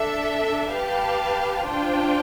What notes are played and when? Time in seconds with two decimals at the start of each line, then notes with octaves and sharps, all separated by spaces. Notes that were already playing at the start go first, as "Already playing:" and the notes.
Already playing: D4 A4 E5
0.73 G4 B4 F5 A5
1.67 D4 F4 C5 G5